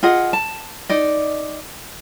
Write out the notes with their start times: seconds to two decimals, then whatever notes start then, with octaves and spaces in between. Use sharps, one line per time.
0.03 F4 G#4 D#5 F#5
0.33 A5
0.89 D#4 D5 D#5